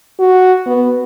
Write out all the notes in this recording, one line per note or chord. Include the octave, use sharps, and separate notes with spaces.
F#4
B3